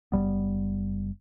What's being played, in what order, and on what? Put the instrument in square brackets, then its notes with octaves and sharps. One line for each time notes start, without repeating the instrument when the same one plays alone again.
[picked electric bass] F#1 F#2 G3 B3